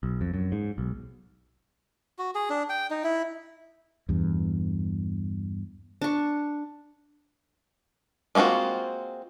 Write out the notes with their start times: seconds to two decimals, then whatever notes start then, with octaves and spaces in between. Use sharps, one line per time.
0.03 B1
0.21 F2
0.34 F#2
0.52 G#2
0.78 B1
2.18 F#4
2.35 G#4
2.50 D4
2.69 G5
2.91 D#4
3.04 E4
4.09 E2 G2
6.02 D4 C#6
8.35 G#3 A#3 C4 F4 F#4